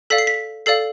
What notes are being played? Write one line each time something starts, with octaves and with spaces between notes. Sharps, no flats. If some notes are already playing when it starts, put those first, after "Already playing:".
A4 D5 F5 B6
C7
B6
A4 D5 F5 C7